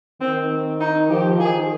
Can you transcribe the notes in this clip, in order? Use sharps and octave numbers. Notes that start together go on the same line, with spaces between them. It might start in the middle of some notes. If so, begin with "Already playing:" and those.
D#3 C4
D#4
F3 G4
D#3 G#4